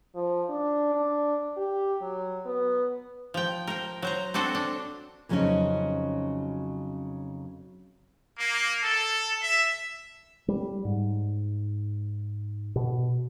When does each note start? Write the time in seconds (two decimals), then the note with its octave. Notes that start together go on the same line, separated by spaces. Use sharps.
0.15 F3
0.50 D4
0.95 D4
1.57 G4
2.02 F#3
2.46 B3
3.34 F3 G5
3.67 A#4 C5 G5
4.02 F#3 C5 A#5
4.34 C4 D4 F#4 A4 C5
4.55 D4
5.29 F2 C#3 F#3 B3 C#4 D#4
8.37 A#3
8.82 A4
9.42 E5
10.48 G3
10.85 G#2
12.76 B2